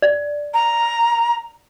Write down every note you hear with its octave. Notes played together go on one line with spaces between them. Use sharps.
D5
A#5